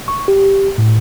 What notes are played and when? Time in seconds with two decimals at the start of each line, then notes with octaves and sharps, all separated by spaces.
0.08 C#6
0.28 G4
0.78 A2